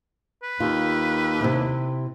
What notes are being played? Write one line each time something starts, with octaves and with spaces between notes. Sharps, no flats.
B4
D#2 F4
C3 C4 E4